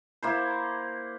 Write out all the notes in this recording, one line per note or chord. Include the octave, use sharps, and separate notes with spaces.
A#3 E4 C5